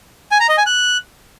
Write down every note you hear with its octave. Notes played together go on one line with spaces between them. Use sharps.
G#5
A#5
D#5
G#5
F#6